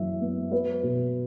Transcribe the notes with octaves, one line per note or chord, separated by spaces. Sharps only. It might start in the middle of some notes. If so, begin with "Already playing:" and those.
Already playing: F#2 E3 E5
B3
F#3 B4
B2